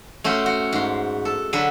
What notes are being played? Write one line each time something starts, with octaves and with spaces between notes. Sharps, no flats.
A3 C#4 F#4 C5
F#4
G#2 C6
A4
D3 F#3 A4 B4